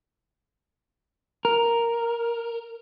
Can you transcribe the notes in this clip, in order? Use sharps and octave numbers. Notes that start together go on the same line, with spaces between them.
A#4